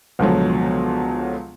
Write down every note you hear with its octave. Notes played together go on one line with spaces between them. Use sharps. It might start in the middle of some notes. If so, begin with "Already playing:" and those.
C#2 B2 D3 F3 F#3